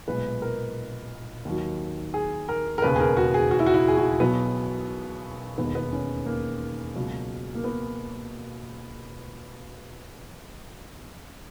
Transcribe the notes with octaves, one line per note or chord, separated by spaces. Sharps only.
B1 A#2 G#3 B4
A#4
D#2 D#3 F#3
G#4
A#4
A#4
E1 D#2 C#3 B4
G#4
A#4
F#4
G#4
F#4
E4
F#4
E4
G#4
F#4
B1 B2 F#3 B3
E1 D#2 D#3 B3
B3
C#4
A#3
C#2 B2 F#3
A#3
B3